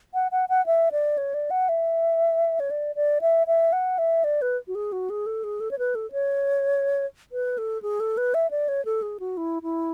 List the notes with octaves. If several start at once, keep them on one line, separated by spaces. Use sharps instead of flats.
F#5
F#5
F#5
E5
D5
C#5
D5
F#5
E5
C#5
D5
D5
E5
E5
F#5
E5
D5
B4
F#4
G#4
F#4
G#4
A4
G#4
A4
C#5
B4
A4
C#5
B4
A4
G#4
A4
B4
E5
D5
C#5
A4
G#4
F#4
E4
E4